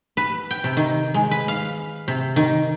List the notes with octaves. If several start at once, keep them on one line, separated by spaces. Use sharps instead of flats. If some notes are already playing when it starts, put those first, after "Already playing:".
B4
G5
C3
D#3
G#3
B4
F5
C3
D#3